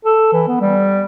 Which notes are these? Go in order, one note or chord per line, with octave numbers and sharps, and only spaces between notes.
A4
E3
B3
G3